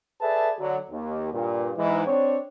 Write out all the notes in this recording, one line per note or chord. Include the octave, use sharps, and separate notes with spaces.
G#4 A4 B4 D5 E5 A5
D3 F#3
D#2
G2 A#2
G#2 E3
C4 D4 C#5